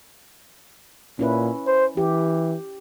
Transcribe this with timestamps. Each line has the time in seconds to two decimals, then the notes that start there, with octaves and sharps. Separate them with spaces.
1.19 A#2 C#4 E4 B4
1.67 C5
1.97 E3 G4